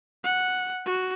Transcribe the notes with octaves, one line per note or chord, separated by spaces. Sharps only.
F#5
F#4